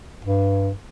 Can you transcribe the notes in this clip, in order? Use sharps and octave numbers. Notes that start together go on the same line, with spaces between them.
G2